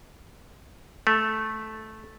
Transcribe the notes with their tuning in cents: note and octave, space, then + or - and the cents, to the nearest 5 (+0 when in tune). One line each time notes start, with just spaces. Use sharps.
A3 -10